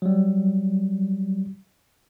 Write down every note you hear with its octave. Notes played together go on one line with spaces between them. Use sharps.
F#3 G3